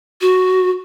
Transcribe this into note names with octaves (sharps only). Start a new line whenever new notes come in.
F#4